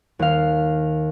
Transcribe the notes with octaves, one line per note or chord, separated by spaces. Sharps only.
D#2 F5